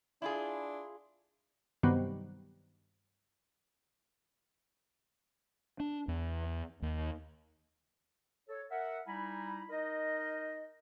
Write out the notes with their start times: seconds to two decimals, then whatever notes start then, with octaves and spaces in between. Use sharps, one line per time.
0.22 D4 E4 F4 G#4
1.83 G2 C3 D#3 F#3 G3 B3
5.80 D4
6.08 E2
6.82 D#2
8.48 A4 C#5
8.71 A#4 E5 F#5
9.07 G3 D#4 E4 G#5 A#5 B5
9.70 D#4 A#4 D#5